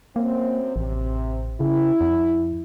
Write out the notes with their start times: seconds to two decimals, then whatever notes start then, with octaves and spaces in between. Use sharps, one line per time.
0.16 F#2 A#3 C4
0.76 A1 C3
1.60 C#3 E4
2.01 F2